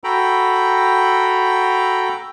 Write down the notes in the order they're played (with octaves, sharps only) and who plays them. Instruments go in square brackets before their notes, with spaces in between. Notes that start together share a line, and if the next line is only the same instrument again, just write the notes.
[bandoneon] F#4 A4 G5 A#5 B5